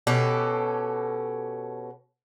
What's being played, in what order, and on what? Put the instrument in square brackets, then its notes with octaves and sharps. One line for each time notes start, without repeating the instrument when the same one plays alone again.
[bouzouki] B2 C#4 G4 A4